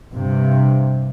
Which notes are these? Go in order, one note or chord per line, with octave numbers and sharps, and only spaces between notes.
G2 C3